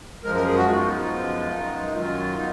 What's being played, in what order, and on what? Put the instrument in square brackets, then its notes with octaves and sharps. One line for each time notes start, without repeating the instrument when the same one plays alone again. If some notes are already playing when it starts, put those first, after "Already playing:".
[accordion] F#2 F3 G#3 A#4
A#4
G#4
F#4
F#2 F3 B3 D#4 F4
F#2 F3 G#3 B3
F#2 D#3 G#3 D#4
F#2 D#3 F#3 F4
B3 D#4